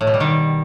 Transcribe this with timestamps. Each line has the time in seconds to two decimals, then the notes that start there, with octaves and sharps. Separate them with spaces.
0.01 A2
0.07 B2
0.14 G3
0.20 D#3